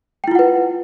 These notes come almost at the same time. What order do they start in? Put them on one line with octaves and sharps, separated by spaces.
G5 E4 F4 F#5 B4